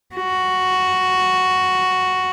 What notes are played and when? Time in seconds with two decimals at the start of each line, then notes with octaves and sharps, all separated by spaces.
0.16 F#4